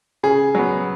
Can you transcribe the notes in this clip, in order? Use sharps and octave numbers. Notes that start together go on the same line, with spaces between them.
C#3 G#4
F#3 B3